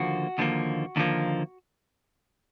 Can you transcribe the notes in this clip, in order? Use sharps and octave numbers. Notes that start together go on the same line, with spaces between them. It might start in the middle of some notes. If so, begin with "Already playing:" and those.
Already playing: D#2 D3 F3 A#3 F#4
D#2 D3 F3 A#3
D#2 D3 F3 A#3